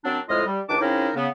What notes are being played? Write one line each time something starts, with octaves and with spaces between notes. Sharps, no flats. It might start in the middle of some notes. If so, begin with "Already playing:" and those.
F#2 F#3 C4 D4
F2 A2 G#3 F4 D#5 F6
G3
C#2 D#3 D4 A5 D6
C#3 C4 C#4 D#4 E4 A#4
C#3 B3